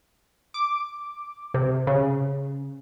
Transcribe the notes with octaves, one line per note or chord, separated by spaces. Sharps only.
D6
C3
C#3